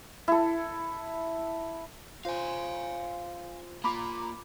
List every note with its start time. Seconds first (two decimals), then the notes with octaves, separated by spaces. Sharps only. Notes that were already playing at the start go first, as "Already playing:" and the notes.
0.28 E4 A4
2.25 F4 C5 F5 G#5
3.84 A#3 F4 A#5 B5 D6